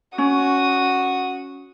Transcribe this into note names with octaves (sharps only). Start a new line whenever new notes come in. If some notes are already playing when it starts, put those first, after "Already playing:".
C#4 F#4 D#6